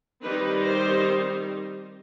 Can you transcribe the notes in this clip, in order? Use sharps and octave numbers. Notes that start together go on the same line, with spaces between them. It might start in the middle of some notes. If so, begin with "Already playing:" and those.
D#3 G3 C4 D#4 B4
C5